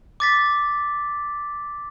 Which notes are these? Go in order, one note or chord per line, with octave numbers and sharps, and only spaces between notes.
D6 A6 B6